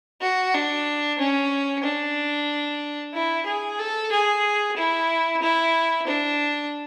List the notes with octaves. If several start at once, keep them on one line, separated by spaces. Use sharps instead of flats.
F#4
D4
C#4
D4
E4
G#4
A4
G#4
E4
E4
D4